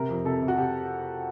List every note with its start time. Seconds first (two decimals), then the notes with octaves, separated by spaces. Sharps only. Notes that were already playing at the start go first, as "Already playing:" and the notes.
Already playing: C3 A#4
0.09 F2
0.25 C3 A4
0.42 C3
0.48 F#4
0.58 C3 G4